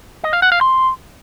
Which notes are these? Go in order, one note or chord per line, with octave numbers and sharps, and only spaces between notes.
D#5
F5
F#5
F5
C6